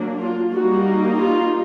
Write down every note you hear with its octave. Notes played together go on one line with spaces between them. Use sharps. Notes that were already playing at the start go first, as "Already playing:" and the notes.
Already playing: F#3 A#3 D4
F4
G3 A#3 D#4 F#4
F4